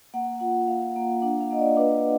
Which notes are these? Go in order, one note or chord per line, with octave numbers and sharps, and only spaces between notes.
A#3 F#5
F4 F#5
A#3 F5
A#3
D4 F#5
F5
A#3 D#5
D5
D4 B4